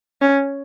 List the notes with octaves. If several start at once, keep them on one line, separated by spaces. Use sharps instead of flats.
C#4